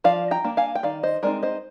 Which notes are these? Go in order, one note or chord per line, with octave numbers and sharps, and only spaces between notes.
F3 D5 F5
G5 A#5
A#3 D4
F5 G#5
G5
D#3 D5 F5
C5 D#5
G#3 C4 D#4 A#4 D5
C5 D#5